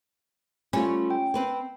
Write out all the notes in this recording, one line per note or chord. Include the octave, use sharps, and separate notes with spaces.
G3 A3 C#4 F4 B5
G5
C4 B4 C5